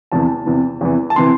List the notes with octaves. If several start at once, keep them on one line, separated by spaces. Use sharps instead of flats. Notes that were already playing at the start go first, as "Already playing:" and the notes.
E2 C3 E3 A5
E2 C3 E3
E2 C3 E3
A5
C3 E3 C6